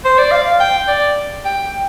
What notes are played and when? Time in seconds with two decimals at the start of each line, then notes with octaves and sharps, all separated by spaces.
0.05 C5
0.18 D5
0.31 F5
0.60 G5
0.88 D5
1.45 G5